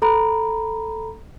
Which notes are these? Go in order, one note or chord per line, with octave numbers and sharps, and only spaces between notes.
A4 A#5 B5